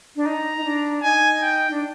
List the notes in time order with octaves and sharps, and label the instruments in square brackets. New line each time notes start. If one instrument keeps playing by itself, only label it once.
[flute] D4
[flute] D#4 [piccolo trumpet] A#5
[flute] D#4
D4
[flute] D#4 [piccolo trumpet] G#5
[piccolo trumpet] G5
[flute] D4